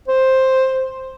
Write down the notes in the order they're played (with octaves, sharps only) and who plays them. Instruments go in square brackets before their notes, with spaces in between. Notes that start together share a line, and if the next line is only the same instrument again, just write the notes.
[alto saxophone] C5